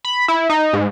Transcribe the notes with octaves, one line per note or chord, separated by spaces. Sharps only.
B5
E4
D#4
G#2